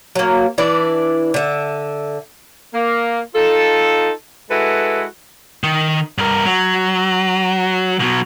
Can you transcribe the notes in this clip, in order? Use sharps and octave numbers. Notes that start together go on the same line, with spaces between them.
F#3 A#3
E3 D4 E4 D5
D3 E5
A#3
D#4 F4 A4
G#3 E4 F#4 A4 B4
D#3
G2 A#4
F#3
B2 F#3